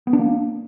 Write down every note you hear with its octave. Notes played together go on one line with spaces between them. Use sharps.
B3
D4
A#3